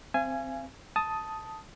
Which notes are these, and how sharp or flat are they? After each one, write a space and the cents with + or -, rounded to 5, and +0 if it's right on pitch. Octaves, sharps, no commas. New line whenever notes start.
C4 +0 F5 -40 G#5 +0
A5 +0 D#6 +10